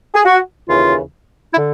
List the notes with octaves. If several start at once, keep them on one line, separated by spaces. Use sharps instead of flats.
G#4
F#4
D#2 C#3 E3 F4
E4
D3